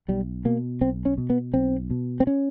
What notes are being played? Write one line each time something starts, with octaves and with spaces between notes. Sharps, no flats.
B1 G3
B2 A#3
B1 C4
C#4
B2
B3
B1 C4
B2
C4
C#4